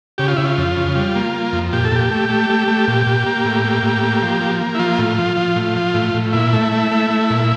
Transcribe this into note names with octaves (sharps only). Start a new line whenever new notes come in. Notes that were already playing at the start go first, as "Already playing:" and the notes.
C#3 G4
F4
C#3 E4
F4
F2
C#3
G3
A#3
A#3
F2
A#2 G4
A4
A#2 G4
A3
A3
A3
A3
A#2
A#2
A#3
A2
A#3
A2
A#3
F3
A#3
A#3
E4
F3 F4
A2
F3
F3
A2
F3
A2
A2
A#2 E4
A3
A3
A3
A3
A#2